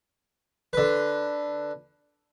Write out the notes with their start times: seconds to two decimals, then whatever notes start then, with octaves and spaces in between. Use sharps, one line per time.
0.73 D3 B4